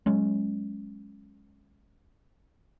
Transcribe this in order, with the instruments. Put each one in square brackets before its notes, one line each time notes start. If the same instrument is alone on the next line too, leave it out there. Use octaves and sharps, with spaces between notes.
[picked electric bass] F#3 G#3 C#4